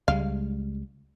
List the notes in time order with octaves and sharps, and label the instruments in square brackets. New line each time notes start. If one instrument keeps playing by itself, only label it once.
[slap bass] C#2 G3 G#3 [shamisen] F5